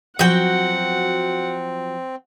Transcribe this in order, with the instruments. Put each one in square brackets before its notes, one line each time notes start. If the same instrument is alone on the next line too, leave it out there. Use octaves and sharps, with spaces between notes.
[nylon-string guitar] F3 F#3 [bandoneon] C4 [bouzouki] F#4 G5 [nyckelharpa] F#5